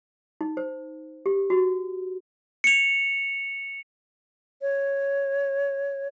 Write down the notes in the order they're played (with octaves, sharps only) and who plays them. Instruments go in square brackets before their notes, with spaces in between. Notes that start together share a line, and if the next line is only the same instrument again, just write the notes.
[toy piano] D#4
C5
G4
F#4
[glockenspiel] C#7 F7
[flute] C#5